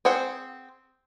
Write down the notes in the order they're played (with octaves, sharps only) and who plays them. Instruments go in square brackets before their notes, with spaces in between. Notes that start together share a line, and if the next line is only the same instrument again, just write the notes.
[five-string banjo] C4 G#4 C5 F#5